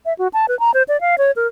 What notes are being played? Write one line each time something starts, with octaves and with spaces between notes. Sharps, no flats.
E5
F#4
A5
B4
A#5
C5
D5
F5
C#5
A#4